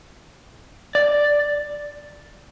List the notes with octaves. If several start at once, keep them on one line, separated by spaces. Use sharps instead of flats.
D5